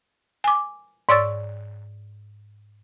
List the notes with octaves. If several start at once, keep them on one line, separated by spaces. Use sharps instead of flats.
G#5 D6
G#2 C#5 D5 C#6 E6 A6